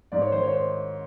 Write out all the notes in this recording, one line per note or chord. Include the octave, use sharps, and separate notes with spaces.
G#2 D5
C#5
D#3 C5
C#5
C5